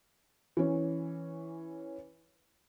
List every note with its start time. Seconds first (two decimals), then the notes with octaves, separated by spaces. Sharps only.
0.57 E3 C#4